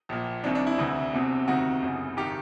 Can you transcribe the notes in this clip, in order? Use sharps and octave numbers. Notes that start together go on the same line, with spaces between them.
A#1 A#2
C2 C3 D#3 D4
D4
E4
D2 C3 E3
E1 E2 C3
D2 C3 D#3 F#4
F#1 E2 C#3
G#1 D#3 G4